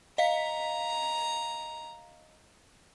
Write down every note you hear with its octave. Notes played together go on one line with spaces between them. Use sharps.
D#5 F5 A#5 B6